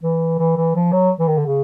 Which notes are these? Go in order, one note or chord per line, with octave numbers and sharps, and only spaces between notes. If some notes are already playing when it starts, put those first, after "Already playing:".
E3
E3
E3
F3
F#3
E3
D#3
D3
C#3